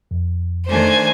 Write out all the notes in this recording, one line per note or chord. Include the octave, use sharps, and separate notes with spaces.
F2
D#3 A3 D4 C5 G#5